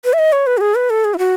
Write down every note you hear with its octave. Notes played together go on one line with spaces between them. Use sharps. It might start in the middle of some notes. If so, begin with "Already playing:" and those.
B4
E5
D#5
C#5
B4
F#4
G#4
B4
A4
G#4
E4
F#4